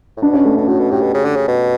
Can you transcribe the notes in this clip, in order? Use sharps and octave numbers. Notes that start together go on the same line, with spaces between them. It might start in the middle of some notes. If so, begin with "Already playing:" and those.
A2
B2 D4
C#4
A3
B2 C#4
A2 F#4
B2
A2 G4
B2
C#3
D3
C#3
B2